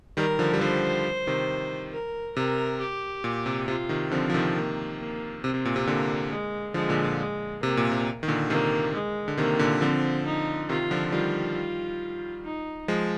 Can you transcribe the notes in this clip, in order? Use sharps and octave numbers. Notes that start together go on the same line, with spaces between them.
D#3 G3 A#4
D3 F3
G3
D3 F3 C5
C3 D#3
A#4
C3 A#4
G4
A#2
C3
C3 F4
C3 D#3
D3 F3 C4
F3
C3 D#3
A#3
A#3
C3 C4
C3
A#2
C3
A#2 D3 A#3
G#3
D3 F3 G#3
A#2 D3
A#2
G#3
C3 A#3
A#2
C3
D#3
A#2 D3
C3 D#3 A#3
G#3
D3
C3 D#3 A#3
A#2 D3
D3 F3 C4
D#4
C3 D#3 F4
D3 F3
D#3 G3 F4
D#4
F3 G#3